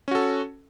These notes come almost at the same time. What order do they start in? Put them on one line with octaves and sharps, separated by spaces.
C#4 F#4 A4